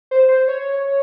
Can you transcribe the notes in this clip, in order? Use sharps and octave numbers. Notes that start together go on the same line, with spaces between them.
C5
C5
C#5